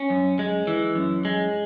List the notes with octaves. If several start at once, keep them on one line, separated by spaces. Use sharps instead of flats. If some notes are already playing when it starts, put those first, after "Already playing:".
Already playing: C#4
F#2
G#3
E3
F#2
G#3